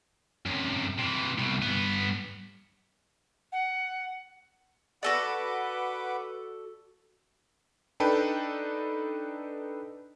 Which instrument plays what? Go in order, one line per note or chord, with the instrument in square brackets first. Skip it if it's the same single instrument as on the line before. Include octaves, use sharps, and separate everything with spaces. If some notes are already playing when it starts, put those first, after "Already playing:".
[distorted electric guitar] F#2 C3
C3 E3
C2 B2
G2 B3
[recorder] F#5
[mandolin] F#4 A4 D5 [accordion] B4 F#5 D6
[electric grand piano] D4 D#4 A4 B4 G5